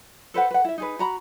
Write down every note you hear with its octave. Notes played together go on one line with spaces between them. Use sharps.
A4 B4 C5 F#5
B4 F#5
E4 E5
D#4 G#4 B4
F#4 A#5 B5